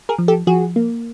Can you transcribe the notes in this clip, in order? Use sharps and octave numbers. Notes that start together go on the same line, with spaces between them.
G#4 A#4
F3
G4 A4
F3 F#4 G#4
A#3